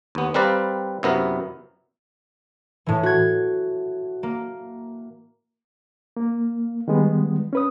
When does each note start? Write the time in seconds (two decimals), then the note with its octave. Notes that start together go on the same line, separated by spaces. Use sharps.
0.15 D#2 B3
0.34 G3 C4 A#4 B4 D5 F5
1.03 F#2 C3 B3 E4 A#4
2.86 A2 E3
3.03 F#4 G#6
4.23 A#3
6.17 A#3
6.88 D#3 G3 G#3 B3
7.53 C#4 B4 D#6